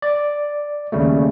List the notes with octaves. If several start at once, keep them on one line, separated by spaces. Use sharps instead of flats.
D5
D#2 C#3 G3 A3